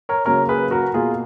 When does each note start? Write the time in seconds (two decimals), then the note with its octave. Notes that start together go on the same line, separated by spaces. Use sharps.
0.09 A#4 C#5
0.25 C#3 F#3 A#3 A#4 C#5
0.49 G#4 B4
0.71 F#4 A#4
0.94 B2 A#3 F4 G#4